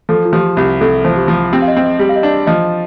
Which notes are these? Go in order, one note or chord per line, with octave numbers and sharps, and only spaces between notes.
F3 A4
F4
F3 G4
C2 G4
C2 A4
F3 C5
G4
F3 F4
C4 G4
F5
D#5
C4
D#5
G3
F5
D#5
D4
F3 D#5